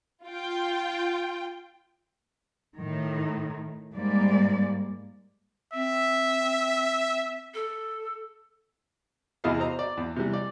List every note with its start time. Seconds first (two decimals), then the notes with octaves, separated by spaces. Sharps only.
0.25 F4 G5
2.78 A2 D#3
3.92 G#2 G3 G#3 A#3 D5
5.73 C4 E5
7.54 A4
9.44 E2 C3 E4 G#4 D#5 F5
9.60 C5 D#5 A#5
9.79 D5
9.97 E2
10.16 C3 E3 G3
10.33 D5